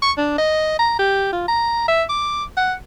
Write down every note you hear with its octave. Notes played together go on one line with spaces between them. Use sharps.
C#6
D4
D#5
A#5
G4
F4
A#5
E5
D6
F#5